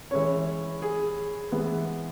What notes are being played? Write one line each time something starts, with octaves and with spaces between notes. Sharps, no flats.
E3 G#3 C#4 C#5
G#4
E3 G#3 B3